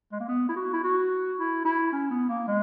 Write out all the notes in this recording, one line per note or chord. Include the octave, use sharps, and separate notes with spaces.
G#3
A#3
B3
E4
F#4
E4
F#4
E4
E4
C#4
B3
A#3
G#3